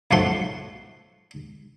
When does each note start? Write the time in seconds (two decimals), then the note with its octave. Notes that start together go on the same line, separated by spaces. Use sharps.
0.11 B1 F#2 F3 A3 F#5 C6